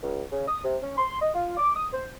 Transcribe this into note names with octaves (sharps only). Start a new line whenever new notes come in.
C#2
C#3
D#6
C3
C#4
C6
D#5
F4
D6
D#6
C5